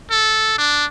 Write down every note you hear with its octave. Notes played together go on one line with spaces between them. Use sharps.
A4
D4